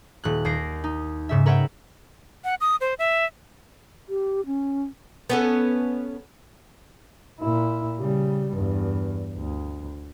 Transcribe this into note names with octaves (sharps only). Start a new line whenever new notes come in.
D#1 F#6
D#2 A#6 C7 D7
D#4
G#2 C#3 E5
A#4 B4 C#5 E5 F#5 G5
F#5
D#6
C5
E5
G4
C#4
B3 C#4 A4
A#2 E4
C#3 G3
E2 G2
D2